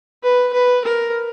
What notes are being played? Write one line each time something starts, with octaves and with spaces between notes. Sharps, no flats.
B4
B4
A#4